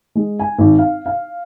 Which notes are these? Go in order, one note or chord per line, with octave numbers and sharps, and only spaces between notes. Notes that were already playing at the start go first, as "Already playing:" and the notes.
G#3
G#5
G#1
F5
F5